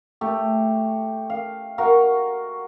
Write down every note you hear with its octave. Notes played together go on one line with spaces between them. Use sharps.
A3 G4
F5
F#4 A#4 F5 C#6